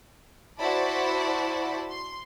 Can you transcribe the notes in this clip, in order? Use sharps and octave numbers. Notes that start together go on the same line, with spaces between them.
E4 F#4 C5 D5 A5 B5
C6